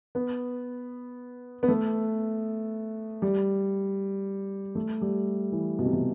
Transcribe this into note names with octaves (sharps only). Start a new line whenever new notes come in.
B3
B3
A3
G3
A3
G3
E3
B2
C3
B2